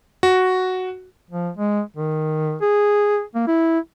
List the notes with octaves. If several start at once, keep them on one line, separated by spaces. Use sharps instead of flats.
F#4
F3
G#3
D#3
G#4
A#3
E4